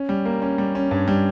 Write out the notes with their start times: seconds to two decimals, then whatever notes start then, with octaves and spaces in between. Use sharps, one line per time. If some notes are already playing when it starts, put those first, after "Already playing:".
Already playing: C#4
0.09 G3
0.25 A#3
0.42 C#4
0.58 G3
0.75 C#4
0.91 G2
1.08 G3